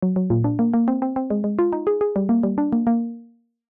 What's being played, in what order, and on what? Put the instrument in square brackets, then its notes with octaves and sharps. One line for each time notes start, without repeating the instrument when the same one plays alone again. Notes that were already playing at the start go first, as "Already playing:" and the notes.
[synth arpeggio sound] F#3
F#3
A#2
D4
A#3
A#3
C4
C4
C4
G#3
G#3
F4
D#4
G#4
G#4
G3
A#3
G3
D4
A#3
A#3